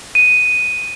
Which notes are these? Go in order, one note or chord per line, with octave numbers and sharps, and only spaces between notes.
D#7